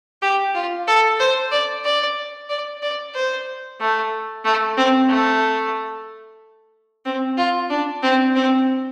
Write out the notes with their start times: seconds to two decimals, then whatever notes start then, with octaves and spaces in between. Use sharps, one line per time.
0.22 G4
0.55 F4
0.88 A4
1.19 C5
1.52 D5
1.84 D5
2.49 D5
2.82 D5
3.15 C5
3.80 A3
4.45 A3
4.77 C4
5.10 A3
7.06 C4
7.37 F4
7.70 D4
8.03 C4
8.35 C4